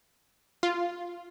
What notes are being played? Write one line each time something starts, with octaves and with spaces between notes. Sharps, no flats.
F4